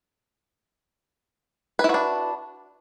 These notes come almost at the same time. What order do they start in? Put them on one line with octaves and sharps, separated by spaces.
B4 E4 F#4 D4